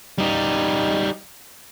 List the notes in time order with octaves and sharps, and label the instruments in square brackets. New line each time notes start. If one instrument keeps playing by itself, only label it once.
[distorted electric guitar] G3 D#4